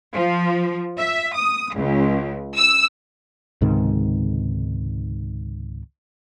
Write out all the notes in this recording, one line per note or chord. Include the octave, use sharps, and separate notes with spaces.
F3
E5
D#6
C#2
E6
C#2 G#2 C3 D#3